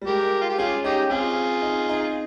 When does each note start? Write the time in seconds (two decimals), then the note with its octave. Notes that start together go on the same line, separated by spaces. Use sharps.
0.02 G3
0.06 G#3 G4 A#4
0.41 F4
0.49 G4
0.58 C#4 F4 G#4
0.84 C#4 D#4 G4
1.10 C4 F4 G#4
1.62 D#4
1.89 D#4